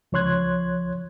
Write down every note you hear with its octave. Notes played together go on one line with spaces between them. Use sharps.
C#2 F3 C#5 C6 F#6 G#6